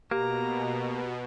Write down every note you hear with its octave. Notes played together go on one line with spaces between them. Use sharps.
B2 A#3 G4 A#5